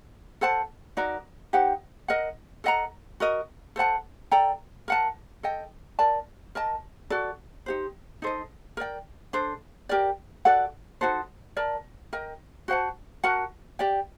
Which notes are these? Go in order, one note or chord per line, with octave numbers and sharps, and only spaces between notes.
A4 C5 F#5 A5
D#4 F#4 A#4 D5
D#4 G4 C5 F#5
A#4 D#5 F#5
A4 D#5 F#5 A#5
F#4 A#4 D#5
A4 C5 F#5 A5
A4 D5 G5 A#5
A#4 F#5 A5
A4 D#5 G5
A#4 D5 A5
A#4 D#5 A5
F#4 A4 D5
D#4 G4 C5
D#4 A4 C5 D#5
A#4 D5 G5
D4 A4 C5
G4 A#4 D5 G5
F#4 A4 D5 F#5
D#4 F#4 A4 C5
A#4 D5 A5
A#4 D#5 G5
F#4 C5 F#5 A5
F#4 A#4 F#5 A5
G4 D5 G5